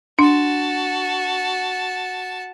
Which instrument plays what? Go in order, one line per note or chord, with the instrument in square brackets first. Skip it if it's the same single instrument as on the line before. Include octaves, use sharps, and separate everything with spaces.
[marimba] D4 [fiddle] F#4 A5